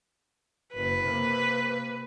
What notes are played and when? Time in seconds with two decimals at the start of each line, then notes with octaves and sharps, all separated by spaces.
0.75 F#1 B4
1.03 C3 A#3